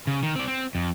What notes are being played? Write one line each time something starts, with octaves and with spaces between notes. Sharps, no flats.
C#3
D#3
C4 D5
C4
F2